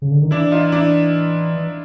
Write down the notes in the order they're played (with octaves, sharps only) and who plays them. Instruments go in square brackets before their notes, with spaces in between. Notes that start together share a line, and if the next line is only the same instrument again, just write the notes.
[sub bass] C#3
D3
D#3
[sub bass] E3 [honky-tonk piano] D4 E4
[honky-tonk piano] D#4 F4
D4 E4